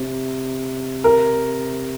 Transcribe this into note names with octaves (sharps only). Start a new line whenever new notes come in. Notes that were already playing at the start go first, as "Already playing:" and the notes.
Already playing: C3
A#4